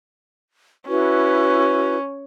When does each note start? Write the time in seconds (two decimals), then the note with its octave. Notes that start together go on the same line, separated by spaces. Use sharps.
0.88 C#4 E4 F#4 B4